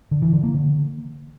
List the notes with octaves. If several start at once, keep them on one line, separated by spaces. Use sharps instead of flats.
D3
E3
D3
A#3
D3